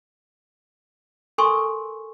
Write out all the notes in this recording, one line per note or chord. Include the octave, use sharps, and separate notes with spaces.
A4 A#4 G#5 C6 C#6 E6